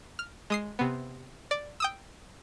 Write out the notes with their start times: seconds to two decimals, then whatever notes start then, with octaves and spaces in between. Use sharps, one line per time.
0.19 F6
0.50 G#3 D#6 C7
0.79 C3 B3
1.51 D5
1.80 G5 D#6 E6